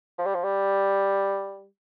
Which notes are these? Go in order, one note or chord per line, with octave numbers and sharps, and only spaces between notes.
F3
G3
F3
G3